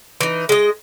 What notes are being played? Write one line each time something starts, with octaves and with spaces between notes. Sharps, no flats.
E3 D#4
G#3 D#5